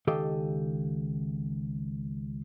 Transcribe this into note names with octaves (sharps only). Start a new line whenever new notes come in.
C#2 D#3 G4 A4 D#5 F5